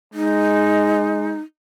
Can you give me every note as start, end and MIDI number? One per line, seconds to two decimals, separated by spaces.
0.14 1.38 56
0.14 1.40 63